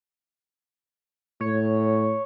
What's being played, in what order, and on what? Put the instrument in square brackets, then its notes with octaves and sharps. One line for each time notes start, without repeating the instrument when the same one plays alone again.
[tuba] A2 [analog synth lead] C#5